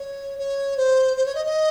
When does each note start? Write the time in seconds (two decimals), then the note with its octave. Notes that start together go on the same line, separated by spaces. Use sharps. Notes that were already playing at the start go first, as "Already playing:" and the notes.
Already playing: C#5
0.38 C#5
0.77 C5
1.17 C5
1.26 C#5
1.35 D#5
1.45 D#5